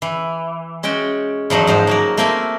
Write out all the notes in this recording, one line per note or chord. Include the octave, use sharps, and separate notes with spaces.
E3
G#3 C#4 F#4 G5
E2 F3 F#3 D#4
G#2 F3 C5
F#3 A#3 A#4
A3 A#3 C4 A#4 E5 G#5